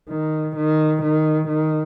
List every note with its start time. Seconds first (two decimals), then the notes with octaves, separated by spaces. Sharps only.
0.09 D#3
0.56 D#3
1.03 D#3
1.48 D#3